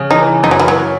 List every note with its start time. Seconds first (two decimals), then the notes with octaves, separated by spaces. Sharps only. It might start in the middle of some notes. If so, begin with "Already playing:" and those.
Already playing: C#3
0.10 E3 D#4
0.26 E3
0.43 F#2 D#4
0.51 F#3
0.60 F#2 E3
0.68 F#3
0.76 C#4